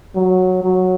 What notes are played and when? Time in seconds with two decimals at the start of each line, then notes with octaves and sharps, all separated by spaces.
0.15 F#3
0.63 F#3